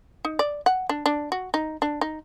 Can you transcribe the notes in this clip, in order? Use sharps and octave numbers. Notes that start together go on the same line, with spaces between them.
D#4
D5
F#5
D4
D4
F#4
D#4
D4
D#4